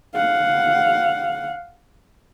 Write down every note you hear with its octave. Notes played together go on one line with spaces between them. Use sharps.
F5 F#5